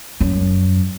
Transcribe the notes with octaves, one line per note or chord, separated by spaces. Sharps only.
F#2